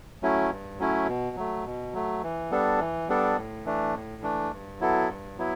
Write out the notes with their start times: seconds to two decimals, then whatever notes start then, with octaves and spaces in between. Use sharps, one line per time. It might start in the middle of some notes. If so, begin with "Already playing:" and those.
0.22 F#3 A3 C#4 E4
0.50 G2
0.79 F#3 A3 C#4 E4
1.08 B2
1.36 F#3 A3
1.65 B2
1.93 F#3 A3
2.23 E3
2.51 G3 B3 D4 A4
2.80 E3
3.09 G3 B3 D4 A4
3.37 A2
3.65 E3 A3 D4
3.95 A2
4.22 E3 A3 D4
4.51 G2
4.80 F#3 B3 E4 A4
5.09 G2
5.38 F#3 B3 E4